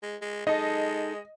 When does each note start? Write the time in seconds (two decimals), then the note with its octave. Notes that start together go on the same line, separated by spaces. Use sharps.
0.03 G#3
0.21 G#3
0.47 G#3 D#4 A4 D#5